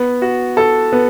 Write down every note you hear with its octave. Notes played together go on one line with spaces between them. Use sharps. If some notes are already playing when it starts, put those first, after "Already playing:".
Already playing: B3
F#4
A4
B3